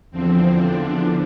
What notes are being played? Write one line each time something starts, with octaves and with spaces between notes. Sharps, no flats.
E2 D3 F3 C4
D4